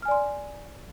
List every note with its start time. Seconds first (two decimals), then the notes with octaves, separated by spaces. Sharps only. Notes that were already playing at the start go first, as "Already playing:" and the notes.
0.02 F6
0.05 G#5
0.08 D5
0.11 C6